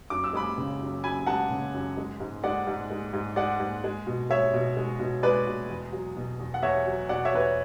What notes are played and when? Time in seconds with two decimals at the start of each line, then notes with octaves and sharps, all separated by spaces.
0.10 F#2 D6
0.24 E6
0.33 G#3 B5 D6
0.58 C#3
0.81 F#2
1.04 F#2 G#5 B5
1.27 G#3 F#5 A5
1.50 C#3
1.74 F#2
1.97 G#3
2.20 G#2
2.44 G#3 D5 F#5
2.67 G#2
2.91 G#3
3.13 G#2
3.36 G#3 D5 F#5
3.60 G#2
3.84 G#3
4.07 B2
4.30 G#3 C#5 E5
4.54 B2
4.77 G#3
5.00 B2
5.23 G#3 B4 D5
5.47 B2
5.70 E2
5.92 F#3
6.17 B2
6.40 E2
6.54 F#5
6.62 E2 C#5 E5
6.86 F#3
7.09 B2 D5 F#5
7.25 C#5 E5
7.33 E2 B4
7.40 C#5